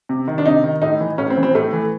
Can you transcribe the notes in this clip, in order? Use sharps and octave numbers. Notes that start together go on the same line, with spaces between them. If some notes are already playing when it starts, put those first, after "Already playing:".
C3
D#3
D4
C3 D#4
D#3
A2 D#4
E3
A2 C#4
C4
E3
C4
A2 A3
E3